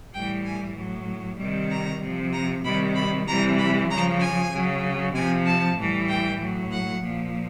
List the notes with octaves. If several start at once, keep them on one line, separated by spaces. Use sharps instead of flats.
A2 E3 G3 G5
G#5
A2 F#3
C3 D#3 G3
A#5
C3 F3
A#5
C3 D#3 G3 B5
B5
C3 E3 G3 A#5
B5
C#3 F3 A#5
G#5
C#3 F#3
C3 F3 G#5
A5
A2 E3 G3
G5
A2 F#3
F#5
A#2 F3